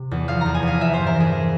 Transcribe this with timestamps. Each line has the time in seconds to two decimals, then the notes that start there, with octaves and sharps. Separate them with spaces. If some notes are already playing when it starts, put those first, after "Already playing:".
Already playing: C3
0.11 E2
0.28 F3 F5
0.41 E2 A#5
0.54 G#5
0.63 E2 F5
0.81 E3 E5
0.94 G2 C5
1.07 A#4
1.16 E3 G#4
1.33 E3